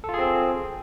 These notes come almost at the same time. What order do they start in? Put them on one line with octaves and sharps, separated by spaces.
A4 F4 G#4 C4